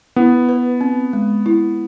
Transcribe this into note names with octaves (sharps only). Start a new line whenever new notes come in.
B3 E4
B4
C4
G#3
E4